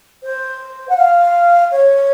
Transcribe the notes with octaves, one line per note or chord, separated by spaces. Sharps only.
C5
F#5
F5
C#5